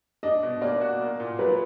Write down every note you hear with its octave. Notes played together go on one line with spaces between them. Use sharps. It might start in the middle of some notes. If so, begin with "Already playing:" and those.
D4 D#5
B2
A#3 D5
F#4
A#3
A#2
F#3 B4